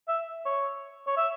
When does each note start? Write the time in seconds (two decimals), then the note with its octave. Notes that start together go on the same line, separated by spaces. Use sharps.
0.08 E5
0.45 C#5
1.07 C#5
1.17 E5